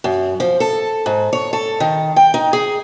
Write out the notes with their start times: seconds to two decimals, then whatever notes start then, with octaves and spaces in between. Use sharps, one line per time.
0.04 F#2
0.40 F3
0.60 A4
1.06 G#2
1.33 C#5
1.53 A4
1.80 D#3
2.16 G5
2.34 D#4
2.53 G#4